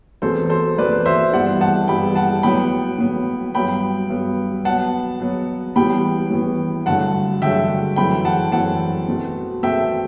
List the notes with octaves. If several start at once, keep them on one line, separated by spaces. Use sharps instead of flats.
E2 B2 A3 C4 A4 C5
A4 C5
E2 B2 A3 C4 B4 D5
C5 E5
G2 E3 G3 B3 D5 F#5
F#5 A5
G2 E3 G3 B3 G5 B5
F#5 A5
A2 F#3 B3 G5 B5
A2 F#3 B3
G2 F#3 B3 G5 B5
G2 F#3 B3
B2 F#3 B3 F#5 A5
B2 F#3 B3
A2 E3 G3 B3 G5 B5
A2 E3 G3 B3
G2 D3 F#3 A3 F#5 A5
G2 D3 F#3 A3 E5 G5
F#2 E3 A3 C4 G5 B5
F#5 A5
F#2 E3 A3 C4 F#5 A5
B2 A3 C4
B2 A3 C4 E5 G5